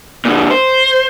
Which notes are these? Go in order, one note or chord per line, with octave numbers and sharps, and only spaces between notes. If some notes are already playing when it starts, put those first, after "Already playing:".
A#2 D3
C5